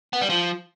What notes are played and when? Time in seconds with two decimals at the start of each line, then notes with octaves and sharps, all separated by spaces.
0.13 B3
0.21 G3
0.30 F3